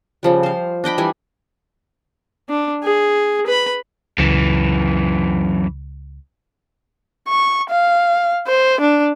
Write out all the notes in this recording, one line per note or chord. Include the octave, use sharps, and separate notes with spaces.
C#3 F3 G3
C5 F5
D4 D#5 G5 B5
E3 G3 E4 G#5
D4
G#4
B4 B5
C#2 F#2 E3
C#6
F5
C5
D4